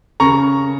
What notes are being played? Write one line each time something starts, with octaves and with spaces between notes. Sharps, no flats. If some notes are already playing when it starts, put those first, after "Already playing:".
C#3 A#5 C#6